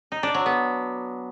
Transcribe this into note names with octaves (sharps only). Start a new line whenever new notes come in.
D#4
D4
F#3
B3